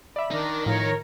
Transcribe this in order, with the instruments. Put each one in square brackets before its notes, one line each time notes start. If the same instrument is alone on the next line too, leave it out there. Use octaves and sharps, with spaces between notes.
[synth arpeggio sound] D5 E5 [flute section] B5
[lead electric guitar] D#3 D#4 [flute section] D4 A#4
[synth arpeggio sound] A2 F3 [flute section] A#4 C#5